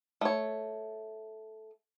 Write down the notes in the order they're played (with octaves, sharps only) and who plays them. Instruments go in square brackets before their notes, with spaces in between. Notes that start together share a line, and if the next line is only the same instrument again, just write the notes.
[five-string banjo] A3 C#5